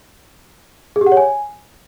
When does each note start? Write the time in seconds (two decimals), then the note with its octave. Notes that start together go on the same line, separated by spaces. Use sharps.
0.96 G#4
1.01 G4
1.06 F#5
1.12 C#5
1.17 G#5